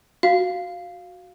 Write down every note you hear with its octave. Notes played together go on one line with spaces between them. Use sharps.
F#4 F5